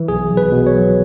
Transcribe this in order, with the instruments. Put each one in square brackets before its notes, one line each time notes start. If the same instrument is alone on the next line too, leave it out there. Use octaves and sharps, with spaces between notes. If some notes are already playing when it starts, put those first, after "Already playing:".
Already playing: [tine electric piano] E3
B1 G#4
B1
B4
B2
C#5
F#3